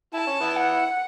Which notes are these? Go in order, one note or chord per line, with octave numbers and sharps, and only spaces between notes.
E4 A5
C#4
B3 E4
F#5